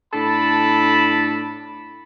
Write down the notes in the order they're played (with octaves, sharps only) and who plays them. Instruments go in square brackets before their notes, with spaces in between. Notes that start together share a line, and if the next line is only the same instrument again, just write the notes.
[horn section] A2 D4 A4 A5 B5